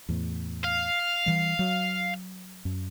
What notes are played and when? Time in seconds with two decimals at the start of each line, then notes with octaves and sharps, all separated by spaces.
0.09 E2 A2
0.64 F5
1.26 E3 G3
1.59 F#3
2.65 F#2